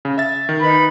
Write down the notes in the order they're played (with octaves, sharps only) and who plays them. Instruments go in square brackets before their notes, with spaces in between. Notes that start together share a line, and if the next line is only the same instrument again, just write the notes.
[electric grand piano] C#3
E5 A6
D#3
[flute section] D#4 B4 B5